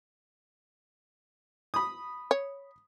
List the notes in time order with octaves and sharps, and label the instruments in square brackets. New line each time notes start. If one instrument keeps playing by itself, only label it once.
[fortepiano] B5 D#6
[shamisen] C#5